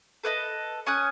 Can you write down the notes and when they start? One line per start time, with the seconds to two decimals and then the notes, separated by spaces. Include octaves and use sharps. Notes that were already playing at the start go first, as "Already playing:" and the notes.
0.24 A4 B4 D5 D#5
0.86 C#4 G#5 D#6 F#6